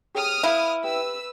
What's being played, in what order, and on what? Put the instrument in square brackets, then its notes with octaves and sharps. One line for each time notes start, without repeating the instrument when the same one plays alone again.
[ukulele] G4 G#4 C#5 [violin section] D#6 F6
[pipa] E4 [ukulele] B4 E5 F5
[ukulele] G4 [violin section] B4 E6